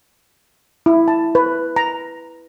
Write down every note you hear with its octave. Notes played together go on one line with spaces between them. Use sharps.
E4
A5
B4
A#5